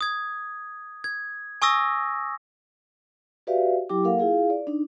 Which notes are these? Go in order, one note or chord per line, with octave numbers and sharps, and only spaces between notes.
D#6 G#6
G#6
G#5 C#6 D#6 E6 A#6
F#4 G4 B4 D5 E5 F5
F#3 E4 G4 G5 D6
A#3 A4 A#4 F5 F#5
E4 F4 G#4 F5
D5
D4 D#4